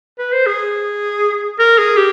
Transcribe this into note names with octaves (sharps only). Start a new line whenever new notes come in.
B4
C5
G#4
A#4
G#4
G4